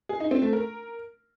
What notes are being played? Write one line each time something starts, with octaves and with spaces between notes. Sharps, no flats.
G#4
D#4
C4
A3
A#4